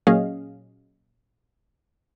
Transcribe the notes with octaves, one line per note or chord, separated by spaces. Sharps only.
A#2 F#3 C#4 G#4 D#5 F5